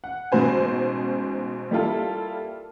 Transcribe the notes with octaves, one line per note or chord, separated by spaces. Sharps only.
F#5
A1 G#2 B2 C5 G#5
G3 A#3 E4 F4 A4